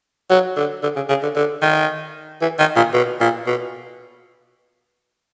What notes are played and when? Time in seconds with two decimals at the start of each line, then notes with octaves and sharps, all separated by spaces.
0.30 F#3
0.57 D3
0.83 D3
0.96 C#3
1.09 C#3
1.22 D3
1.36 D3
1.62 D#3
2.41 E3
2.59 D#3
2.76 A#2
2.93 B2
3.20 A#2
3.46 B2